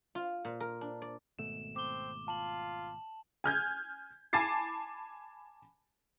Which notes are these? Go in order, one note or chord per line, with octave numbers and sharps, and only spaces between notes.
F4
A#2
A#4
D4
D5
G#1 B2 A3 E7
C4 D6 G7
F4 A5 F#7
G#5 F6 G6 G#6
G#5 A5 B5 D6 A6 C7